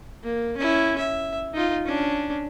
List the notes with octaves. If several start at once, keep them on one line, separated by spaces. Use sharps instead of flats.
A#3
C#4 E4
E5
D#4 F4
C#4 D4